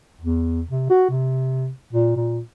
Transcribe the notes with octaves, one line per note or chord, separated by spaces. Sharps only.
E2
C3
F#4
C3
A#2
A#2